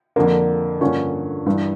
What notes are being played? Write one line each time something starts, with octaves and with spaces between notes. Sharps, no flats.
F2 D3 F3 A#3 D4
G2 D3 F3 A#3 C#4
G2 E3 G3